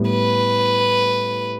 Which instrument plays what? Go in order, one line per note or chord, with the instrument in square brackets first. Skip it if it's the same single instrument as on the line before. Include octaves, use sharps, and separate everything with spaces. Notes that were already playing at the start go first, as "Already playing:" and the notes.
Already playing: [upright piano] A2 G3 B3
[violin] B4